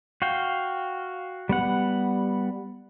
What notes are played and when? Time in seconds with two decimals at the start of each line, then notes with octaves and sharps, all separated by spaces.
0.22 F#4 F5 G5
1.49 G3 B3 F#5